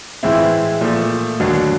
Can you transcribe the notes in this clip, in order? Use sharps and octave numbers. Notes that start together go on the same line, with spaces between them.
A2 E3 G#3 C4 E4
A#2 F3 A3
D#2 D3 F#3